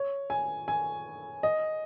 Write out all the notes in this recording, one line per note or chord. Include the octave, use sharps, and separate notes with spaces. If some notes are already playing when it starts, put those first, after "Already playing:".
Already playing: C#5
G#5
G#5
D#5